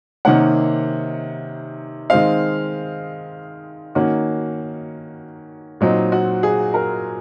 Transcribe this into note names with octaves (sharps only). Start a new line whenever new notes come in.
C3 D#3 A#3 C#4 F#5
D#3 G#3 C4 F5
D#3 A#3 C#4 F#4
A#2 F#3 C4 D#4
F#4
G#4
A#4